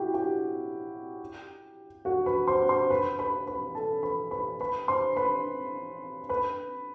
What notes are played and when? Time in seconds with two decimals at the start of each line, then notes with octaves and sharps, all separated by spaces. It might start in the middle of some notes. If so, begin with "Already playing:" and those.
Already playing: E4 F#4 G4 F#5 G5
0.14 G4 G5
2.05 F#4 F#5
2.26 B4 B5
2.47 C5 C6
2.68 C5 C6
2.90 B4 B5
3.19 B4 B5
3.47 B4 B5
3.75 A4 A5
4.03 B4 B5
4.31 B4 B5
4.60 B4 B5
4.88 C5 C6
5.17 B4 B5
6.29 B4 B5